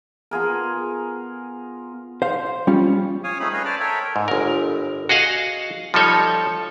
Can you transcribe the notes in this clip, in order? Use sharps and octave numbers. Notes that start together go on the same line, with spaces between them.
B3 F4 G#4 A#4
C5 F5
G3 C#4 F4
C#5 F5 G#5 D#6
A3 C4 D#4 G#4 B5 D#6
G#4 B4 C#5 D#5 F5 G#5
C5 D5 A5 B5 D6 F6
A4 A#4 C#5 E5 G5
G#2
G1 A#4
F#4 G#4 D#5 F5 F#5
F3 G3 D#4 A4 C#5